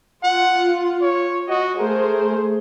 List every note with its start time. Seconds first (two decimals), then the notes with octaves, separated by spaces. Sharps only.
0.23 F4 F#5
1.01 C#5
1.48 F#4 D#5
1.79 A3 G#4 A#4 C5